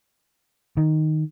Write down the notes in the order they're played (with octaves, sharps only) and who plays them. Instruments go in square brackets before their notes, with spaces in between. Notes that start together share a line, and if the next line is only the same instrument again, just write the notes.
[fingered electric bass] D#3